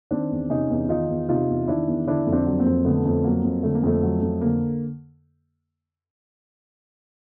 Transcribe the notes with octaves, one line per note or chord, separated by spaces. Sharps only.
D#3 C4 D4
E2
C3 C#4 D#4
E2
D#3 D#4 F4
E2
C3 D#4 F4
E2
D#3 D4 E4
E2
D3 D4 E4
F2
C4 D4
F#3
A#3 C4
F2
D3 A3 B3
F2
F#3 A#3
F2
D3 A3
A#3
F2 A3
F#3
F2
D3 A#3